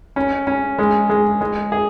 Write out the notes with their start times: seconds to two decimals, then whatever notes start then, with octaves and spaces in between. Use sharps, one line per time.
0.16 C#4
0.47 C#4
0.79 G#3
1.09 G#3
1.41 G#3
1.72 G#4